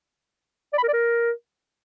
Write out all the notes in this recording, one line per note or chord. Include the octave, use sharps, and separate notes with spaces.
D5
B5
A#4
D5
A#4